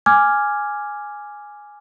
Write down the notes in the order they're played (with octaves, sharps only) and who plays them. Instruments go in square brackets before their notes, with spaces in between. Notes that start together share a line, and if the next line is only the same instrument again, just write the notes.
[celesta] G#5 D6 F6 G#6